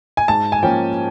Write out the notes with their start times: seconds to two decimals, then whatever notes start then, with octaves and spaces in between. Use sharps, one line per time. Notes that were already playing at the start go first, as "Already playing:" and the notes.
0.17 G#5
0.28 G#2 A5
0.52 G#5
0.63 F3 A#3 C#4 G5